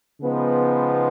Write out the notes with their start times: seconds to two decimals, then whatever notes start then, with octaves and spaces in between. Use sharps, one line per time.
0.21 C#3 F3 G#3 B3 D#4